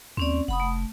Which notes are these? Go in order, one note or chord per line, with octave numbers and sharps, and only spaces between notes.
D#2 C4 C#4 D5
F1 F#5 B5 D#6
A3